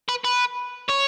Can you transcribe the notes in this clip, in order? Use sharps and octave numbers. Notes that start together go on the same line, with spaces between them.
B4
B4
C#5